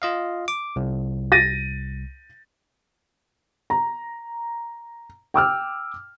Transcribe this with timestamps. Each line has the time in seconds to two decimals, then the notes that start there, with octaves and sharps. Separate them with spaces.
0.02 F4 D#5 F5
0.48 D6
0.76 C2
1.32 A6 A#6 D#7
3.70 A#5
5.34 G5 D6 E6 F6